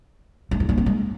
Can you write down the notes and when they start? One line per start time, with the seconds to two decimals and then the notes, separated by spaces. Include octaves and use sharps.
0.51 A3
0.60 E4
0.69 A#3
0.78 C4
0.86 G#3